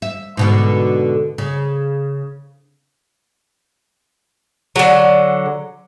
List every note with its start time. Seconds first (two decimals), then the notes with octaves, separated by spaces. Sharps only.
0.02 E5
0.37 G#2 B2 D3
1.38 C#3
4.76 D3 F#3